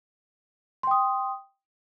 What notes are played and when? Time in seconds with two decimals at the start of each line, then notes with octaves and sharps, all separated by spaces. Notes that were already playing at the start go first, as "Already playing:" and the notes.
0.83 C6
0.87 G5
0.91 D#6